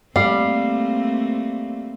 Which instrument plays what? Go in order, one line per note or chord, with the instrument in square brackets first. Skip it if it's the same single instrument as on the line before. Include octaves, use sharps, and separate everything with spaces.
[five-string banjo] G3 [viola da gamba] A3 A#3 C4 [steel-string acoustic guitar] F5